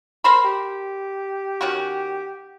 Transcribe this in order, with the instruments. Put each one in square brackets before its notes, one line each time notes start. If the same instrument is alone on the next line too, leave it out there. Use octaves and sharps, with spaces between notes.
[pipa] A#4 C5 B5
[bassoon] G4
[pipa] D#3 C#4 F#4